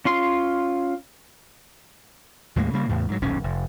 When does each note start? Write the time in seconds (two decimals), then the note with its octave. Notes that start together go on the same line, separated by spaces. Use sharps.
0.05 C#4 F4 C6
2.56 D#2 A2 G#3 A#3
2.73 C#3 G3 A#3
2.88 E2 A2 C#3
3.09 G#2 F#3
3.22 D#1 B1 F#2 C#4
3.44 F1